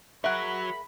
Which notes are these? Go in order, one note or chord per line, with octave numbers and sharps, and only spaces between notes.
F#3 G#4 A#4 E5 F#5 B5